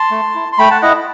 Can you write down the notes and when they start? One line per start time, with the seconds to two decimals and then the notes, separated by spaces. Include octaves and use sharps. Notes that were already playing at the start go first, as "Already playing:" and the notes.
Already playing: A5 C6
0.11 A3
0.35 E4
0.52 C6
0.58 A3 G5 B5
0.71 F#5 A5
0.82 E4 D#5 F#5